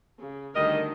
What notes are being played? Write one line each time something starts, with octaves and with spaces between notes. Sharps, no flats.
C#3
D2 D#3 G3 A4 A#4 D#5